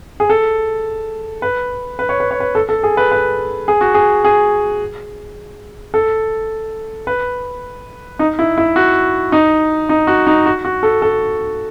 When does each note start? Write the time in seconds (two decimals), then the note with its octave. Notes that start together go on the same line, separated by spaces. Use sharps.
0.20 G#4
0.30 A4
1.42 B4
1.99 B4
2.09 C#5
2.20 B4
2.31 C#5
2.40 B4
2.55 A4
2.69 A4
2.83 G#4
2.97 B4
3.12 B4
3.68 G#4
3.81 F#4
3.94 G#4
4.24 G#4
5.94 A4
7.07 B4
8.19 D#4
8.39 E4
8.58 E4
8.76 F#4
9.32 D#4
9.89 D#4
10.07 F#4
10.27 D#4
10.46 F#4
10.65 F#4
10.83 A4
11.02 A4